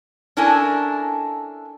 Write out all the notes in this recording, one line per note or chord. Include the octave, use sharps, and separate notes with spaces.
C#4 D4 E4 A4 A#4 G#5